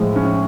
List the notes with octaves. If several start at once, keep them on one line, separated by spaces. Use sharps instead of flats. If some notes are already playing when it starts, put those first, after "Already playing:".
Already playing: A2 F3 G#3
C#4